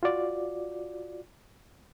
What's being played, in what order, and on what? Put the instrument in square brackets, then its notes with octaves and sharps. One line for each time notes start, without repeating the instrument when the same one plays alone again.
[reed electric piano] F4 F#4 D5